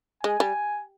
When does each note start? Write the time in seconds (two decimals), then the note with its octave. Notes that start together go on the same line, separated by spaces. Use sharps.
0.23 G#3 G#5
0.40 G3